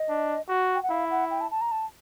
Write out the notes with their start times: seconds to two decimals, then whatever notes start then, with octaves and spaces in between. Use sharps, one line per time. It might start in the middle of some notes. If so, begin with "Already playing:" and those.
Already playing: D#5
0.09 D4
0.49 F#4
0.75 G5
0.83 F#5
0.90 E4 F5
1.10 F#5
1.31 G5
1.41 A5
1.51 A5
1.61 A#5
1.72 A5